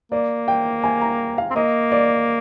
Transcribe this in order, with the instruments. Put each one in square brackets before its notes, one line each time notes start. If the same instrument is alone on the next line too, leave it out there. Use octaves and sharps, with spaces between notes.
[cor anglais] A#3 [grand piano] D5
[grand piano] G5
G#5
A#5
F5
[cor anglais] C4
[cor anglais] A#3 [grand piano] D#5
[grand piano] D5